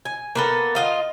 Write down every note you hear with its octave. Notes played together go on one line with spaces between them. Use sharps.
G#5
A#3 B3 A4
F4 D#5 F5